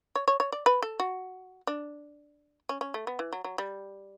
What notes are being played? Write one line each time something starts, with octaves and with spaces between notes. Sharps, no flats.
C#5
C#5
C#5
D5
B4
A4
F#4
D4
C#4
C#4
A3
B3
E3
F#3
F#3
G3